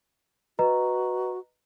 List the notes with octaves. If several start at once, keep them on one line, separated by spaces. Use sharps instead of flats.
F#4 B4 D#5 A#5